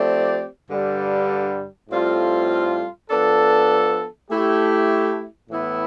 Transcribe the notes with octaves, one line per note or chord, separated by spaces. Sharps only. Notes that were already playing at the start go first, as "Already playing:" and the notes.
Already playing: F3 A3 C4 G4 D5
G2 D3 G3
A2 G3 C4 F4 A4
F3 B3 D4 A4
A3 E4 G4
A2 E3 B3 E4